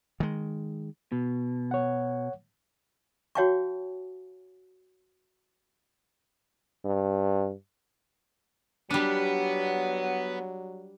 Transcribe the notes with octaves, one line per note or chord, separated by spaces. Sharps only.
D#3 G#3
B2
C#5 F#5
F#4 C#5 F5 G5 A5 C#6
G2
F#3 G3 B3 D4